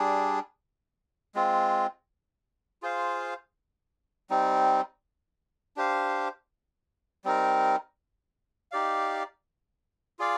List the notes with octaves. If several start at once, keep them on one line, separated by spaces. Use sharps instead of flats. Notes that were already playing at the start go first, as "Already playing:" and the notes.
Already playing: G3 D4 G#4
G#3 C4 F4
F4 G#4 C5 F5
G3 C4 D#4
D4 G4 C5 F5
G3 C4 D#4 A#4
D#4 G4 D5 F5
F4 G#4 D5 F5